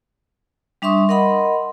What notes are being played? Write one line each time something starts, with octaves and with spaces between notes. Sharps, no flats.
G3 D4 E5 C6 C#6 D#6
A#4 D#5 F#5 B5 C6